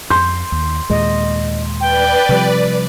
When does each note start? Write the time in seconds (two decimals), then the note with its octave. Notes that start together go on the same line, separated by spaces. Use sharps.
0.10 F2 C6 G6
0.52 D#2
0.90 D#2 A#2 G#3 D#5
1.81 B4 D5 G5
2.29 C3 F3 G3